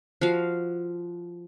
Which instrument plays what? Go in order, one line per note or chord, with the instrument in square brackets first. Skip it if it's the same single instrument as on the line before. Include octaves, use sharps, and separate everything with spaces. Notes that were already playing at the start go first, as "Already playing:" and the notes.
[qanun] F3 F#4 F5